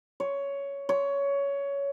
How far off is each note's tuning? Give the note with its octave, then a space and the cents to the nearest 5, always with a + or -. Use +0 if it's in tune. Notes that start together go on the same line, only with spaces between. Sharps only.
C#5 +10
C#5 +15